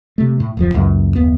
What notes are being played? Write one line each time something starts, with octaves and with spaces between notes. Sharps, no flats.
C3 A3
A2 A3
D1 F2 F3
C#2 F#2 A#2
F#1 D#2 B3